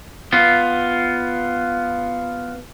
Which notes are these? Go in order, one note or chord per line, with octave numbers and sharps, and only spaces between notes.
B3 F4